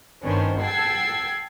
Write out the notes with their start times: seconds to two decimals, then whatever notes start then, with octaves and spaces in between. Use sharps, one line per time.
0.24 G1 D#3 B3 C#4 D4 C5
0.60 F#5 G5 A5 E6 G#6 C7